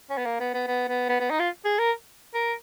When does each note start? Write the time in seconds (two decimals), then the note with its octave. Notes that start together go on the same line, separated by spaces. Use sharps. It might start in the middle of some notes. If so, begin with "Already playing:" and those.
0.10 C#4
0.18 B3
0.25 A#3
0.40 B3
0.54 B3
0.67 B3
0.88 B3
1.09 B3
1.20 B3
1.30 D#4
1.40 F4
1.65 G#4
1.78 A#4
2.34 A#4